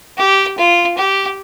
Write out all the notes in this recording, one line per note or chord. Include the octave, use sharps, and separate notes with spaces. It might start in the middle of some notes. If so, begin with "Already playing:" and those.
G4
F4
G4